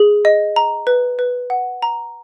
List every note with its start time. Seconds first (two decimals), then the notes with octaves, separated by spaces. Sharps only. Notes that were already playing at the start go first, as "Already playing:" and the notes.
Already playing: G#4
0.25 D#5
0.56 A#5
0.87 B4
1.19 B4
1.50 F#5
1.82 A#5